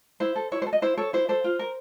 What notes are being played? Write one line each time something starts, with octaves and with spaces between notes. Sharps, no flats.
E4 C5
A4
E4 C#5
C5
A4
D#5
E4 C5
A4 C#5
E4 C5
A4 C5
F4
A#4